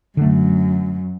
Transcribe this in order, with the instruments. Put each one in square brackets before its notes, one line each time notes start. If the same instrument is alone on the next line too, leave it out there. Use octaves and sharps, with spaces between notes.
[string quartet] F#2 [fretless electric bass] D3 A3